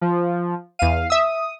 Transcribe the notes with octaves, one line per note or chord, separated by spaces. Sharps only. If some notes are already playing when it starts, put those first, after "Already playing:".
F3
E2 F5 D#7
E5 D#6 E6